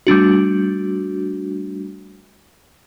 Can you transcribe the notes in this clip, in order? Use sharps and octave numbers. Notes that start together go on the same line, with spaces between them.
G3 A3 D4 F#4